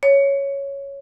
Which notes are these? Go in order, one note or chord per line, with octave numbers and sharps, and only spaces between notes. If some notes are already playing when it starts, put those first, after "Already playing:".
C#5